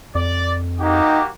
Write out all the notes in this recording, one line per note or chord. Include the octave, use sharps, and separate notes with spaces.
F2 D5
A#3 D#4 F#4 G4